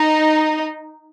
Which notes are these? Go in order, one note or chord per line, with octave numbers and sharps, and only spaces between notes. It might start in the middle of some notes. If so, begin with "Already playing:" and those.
Already playing: D#4